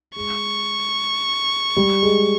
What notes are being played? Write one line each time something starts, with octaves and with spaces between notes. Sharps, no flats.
G#3 C#6
G3
G#3